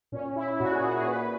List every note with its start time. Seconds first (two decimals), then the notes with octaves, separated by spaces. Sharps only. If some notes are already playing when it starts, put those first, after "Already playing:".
0.12 A#2 C#4
0.36 E4
0.53 E4
0.60 A#2 F#4
0.72 G#4
0.84 F#4
0.96 G#4
1.08 A#2 B4
1.22 B4